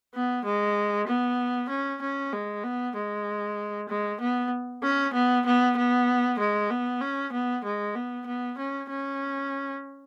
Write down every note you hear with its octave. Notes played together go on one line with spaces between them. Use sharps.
B3
G#3
B3
C#4
C#4
G#3
B3
G#3
G#3
B3
C#4
B3
B3
B3
G#3
B3
C#4
B3
G#3
B3
B3
C#4
C#4